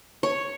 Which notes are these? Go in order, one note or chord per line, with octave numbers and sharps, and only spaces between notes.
C#5